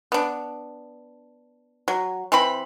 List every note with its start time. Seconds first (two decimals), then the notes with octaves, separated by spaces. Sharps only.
0.12 B3 D4
1.88 F#3
2.32 E3 C4 B5